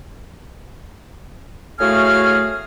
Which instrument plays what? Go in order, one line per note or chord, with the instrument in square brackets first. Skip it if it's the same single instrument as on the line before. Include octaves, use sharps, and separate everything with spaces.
[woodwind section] A2 A3 F#4 G#4 F5 F6